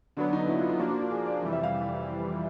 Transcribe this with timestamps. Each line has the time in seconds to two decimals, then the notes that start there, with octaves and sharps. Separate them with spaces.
0.17 D3 F#3 B3 D4
0.33 D#4
0.48 E4
0.59 F4
0.69 F4
0.79 F3 A#3 D4 F#4
0.90 F#4
1.00 F#4
1.11 G#4
1.26 D5
1.42 F2 C3 E3 G3
1.53 E5
1.63 F5